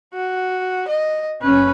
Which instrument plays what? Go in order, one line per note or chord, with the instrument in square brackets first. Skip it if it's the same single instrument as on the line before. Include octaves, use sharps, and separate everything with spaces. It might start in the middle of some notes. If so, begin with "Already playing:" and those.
[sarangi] F#4
D#5
[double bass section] F#1 C#4 [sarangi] B4